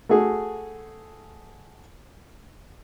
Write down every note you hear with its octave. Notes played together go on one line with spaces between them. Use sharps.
A3 F#4 G#4